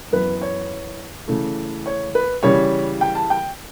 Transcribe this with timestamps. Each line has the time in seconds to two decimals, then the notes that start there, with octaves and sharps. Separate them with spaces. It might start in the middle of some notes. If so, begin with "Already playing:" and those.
0.12 F#2 E3 B3 B4
0.41 C#5
1.28 C#3 E3 A3
1.86 C#5
2.15 B4
2.43 C#3 E3 G3 C#5
3.01 G5
3.15 A5
3.30 G5